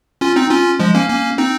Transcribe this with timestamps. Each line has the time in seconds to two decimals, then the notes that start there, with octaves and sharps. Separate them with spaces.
0.21 C#4 F4
0.36 C4 D#4
0.50 C#4 F4
0.79 F3 G#3
0.95 A#3 C#4
1.09 A#3 C#4
1.38 C4 D#4